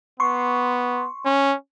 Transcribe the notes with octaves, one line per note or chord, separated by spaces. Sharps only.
B3 C6 C#6
C#4